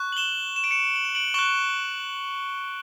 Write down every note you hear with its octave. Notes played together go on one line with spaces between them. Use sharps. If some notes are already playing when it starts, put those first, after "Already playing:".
Already playing: C#6 F#6
F#7
E7 G7
E7
D7
C#7 E7
F#7
E7
D7 F#7
C#6 F#6 E7 G7